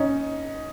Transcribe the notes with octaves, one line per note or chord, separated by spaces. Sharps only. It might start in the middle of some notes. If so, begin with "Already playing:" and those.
Already playing: C#4 D#4